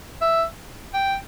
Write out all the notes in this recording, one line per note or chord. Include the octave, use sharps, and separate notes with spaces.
E5
G5